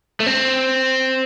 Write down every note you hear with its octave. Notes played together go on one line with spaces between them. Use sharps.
A3
C4